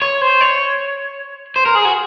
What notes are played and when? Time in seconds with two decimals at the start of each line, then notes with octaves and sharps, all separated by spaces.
0.02 C#5
0.21 C5
0.41 C#5
1.56 C5
1.66 A#4
1.75 G#4
1.85 F#4